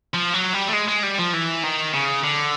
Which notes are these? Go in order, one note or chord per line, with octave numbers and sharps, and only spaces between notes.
F3
F#3
G3
A3
G#3
G#3
G3
F3
E3
D#3
C#3
D3